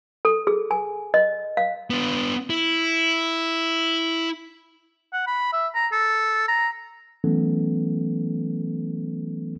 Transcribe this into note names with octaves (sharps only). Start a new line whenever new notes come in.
A4
G#4
G#5
D#5
F5
B3 D4
E4
F#5
B5
E5
A#5
A4
A#5
E3 F#3 A3 B3 C#4 A4